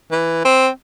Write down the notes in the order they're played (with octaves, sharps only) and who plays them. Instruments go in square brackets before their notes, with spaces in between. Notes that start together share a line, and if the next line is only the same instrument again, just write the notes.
[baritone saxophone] E3
C4